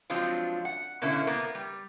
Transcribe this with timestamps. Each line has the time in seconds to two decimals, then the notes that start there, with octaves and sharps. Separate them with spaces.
0.10 F3 F#3 G#3 C4 D4 F4
0.65 F#5
1.02 B2 D3 A#3 C#4 E4
1.27 A#3 B3
1.55 G3